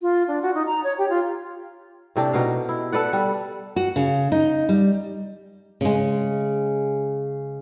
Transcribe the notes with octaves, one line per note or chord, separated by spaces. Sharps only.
F4
D4
F#4
D#4
A#5
C#5
G4
F4
A2 C3 D4 G4
B2 D#4 F5
E4
A4 B4 D5 F#5
G3
F#4
C#3
D#4
G3
C#3 G#3